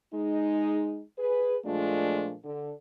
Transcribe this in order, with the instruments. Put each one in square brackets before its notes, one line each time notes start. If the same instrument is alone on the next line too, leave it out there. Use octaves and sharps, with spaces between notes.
[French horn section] G#3 D#4
G#4 B4
A#2 F3 G#3 A3 D4 F4
D3